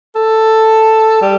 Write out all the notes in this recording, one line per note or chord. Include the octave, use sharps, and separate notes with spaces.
A4
G3